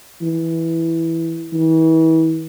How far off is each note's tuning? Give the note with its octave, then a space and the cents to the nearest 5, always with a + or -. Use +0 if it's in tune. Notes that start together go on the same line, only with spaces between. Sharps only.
E3 -5
E3 -35